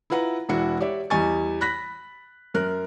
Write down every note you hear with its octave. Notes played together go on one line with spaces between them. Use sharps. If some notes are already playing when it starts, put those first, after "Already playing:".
E4 F4 B4 F#5 A#5
E1 D4 E4 F#4 C#7
G4 C#5 D5 E5
E2 G3 D#5 G#5 C#6 A6
B5 F#6 A#6 B6
F#2 A#4 F#6